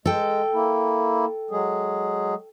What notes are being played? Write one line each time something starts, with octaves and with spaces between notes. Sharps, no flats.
G#3 A4 G5
A#3 E4
F#3 G#3 G#4